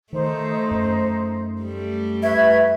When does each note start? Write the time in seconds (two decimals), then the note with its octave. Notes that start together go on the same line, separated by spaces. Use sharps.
0.13 D#3 A3 D#4 C5
0.71 F#2
1.62 G3 A3
2.23 B4 E5 C#6 G#6